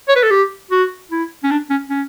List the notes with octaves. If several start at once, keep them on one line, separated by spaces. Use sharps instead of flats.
C#5
B4
A4
G4
F#4
E4
C#4
D4
C#4
C#4